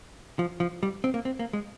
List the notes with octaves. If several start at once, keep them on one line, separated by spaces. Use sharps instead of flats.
F3
F3
G3
C4
A#3
C4
A#3
G#3